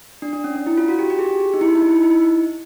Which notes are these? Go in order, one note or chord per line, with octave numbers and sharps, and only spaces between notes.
D4
D4
C#4
D4
E4
F4
F#4
G4
G4
G#4
G4
D#4
E4
D#4
E4
D#4
E4
D#4
E4
D#4